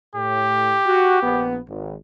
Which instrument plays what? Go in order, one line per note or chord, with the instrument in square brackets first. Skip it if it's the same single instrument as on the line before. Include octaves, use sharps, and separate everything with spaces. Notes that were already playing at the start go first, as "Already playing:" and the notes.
[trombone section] A2 [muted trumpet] G4
[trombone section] F#4
A#1 B3
G#1